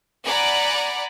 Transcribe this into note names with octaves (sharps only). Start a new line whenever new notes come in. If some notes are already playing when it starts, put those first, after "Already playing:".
D5 F#5 G#5 A#5 B5 D6